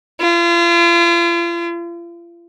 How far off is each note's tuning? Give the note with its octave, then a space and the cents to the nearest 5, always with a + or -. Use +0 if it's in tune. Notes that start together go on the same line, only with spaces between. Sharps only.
F4 -40